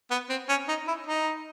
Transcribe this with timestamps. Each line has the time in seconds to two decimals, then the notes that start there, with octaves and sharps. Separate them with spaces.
0.11 B3
0.30 C4
0.49 C#4
0.68 D#4
0.87 E4
1.07 D#4